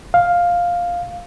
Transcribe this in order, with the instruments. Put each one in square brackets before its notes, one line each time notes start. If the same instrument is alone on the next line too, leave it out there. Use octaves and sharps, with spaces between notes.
[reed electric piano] F5